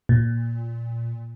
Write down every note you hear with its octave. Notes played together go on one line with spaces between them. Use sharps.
A#2